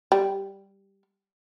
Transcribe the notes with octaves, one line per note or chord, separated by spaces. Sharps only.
G3